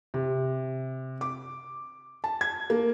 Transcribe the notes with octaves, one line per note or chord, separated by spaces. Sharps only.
C3
D6
A5
G#6
A#3